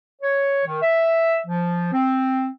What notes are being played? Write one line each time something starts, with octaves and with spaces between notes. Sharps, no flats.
C#5
D#3
E5
F3
C4